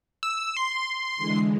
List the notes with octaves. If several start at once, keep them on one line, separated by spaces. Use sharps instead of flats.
E6
C6
D3 E3 G#3